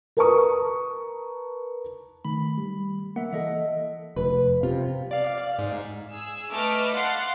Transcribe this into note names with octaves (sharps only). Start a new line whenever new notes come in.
A#4 B4 A5 A#5 C#6 D#6
D#3 A3 B5
G3
A#3 E5 F#5
E3 A4 D#5 E5
F1 B4
C3 F4
D5 F5
G#2
G#4 E6
A3 B4 D#5 D6 F6
F5 F#5 C6 F#6 A6